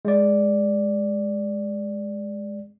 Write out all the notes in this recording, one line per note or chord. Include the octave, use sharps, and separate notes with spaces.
G#3 D5